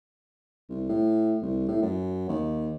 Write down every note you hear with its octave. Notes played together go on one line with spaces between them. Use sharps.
C2
A2
C2
A2
F#2
D#2